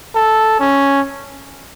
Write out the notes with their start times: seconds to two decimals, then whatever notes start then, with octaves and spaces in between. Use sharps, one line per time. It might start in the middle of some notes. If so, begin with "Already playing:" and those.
0.15 A4
0.60 C#4